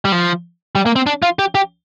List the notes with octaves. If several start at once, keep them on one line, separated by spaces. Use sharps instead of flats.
G3
F3
G3
A#3
C4
D4
F4
G4
G4